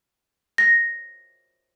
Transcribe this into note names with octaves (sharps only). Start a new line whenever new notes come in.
A#6